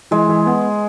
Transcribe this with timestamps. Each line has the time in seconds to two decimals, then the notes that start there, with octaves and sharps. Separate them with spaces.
0.11 E3 G#3
0.29 E3
0.46 B3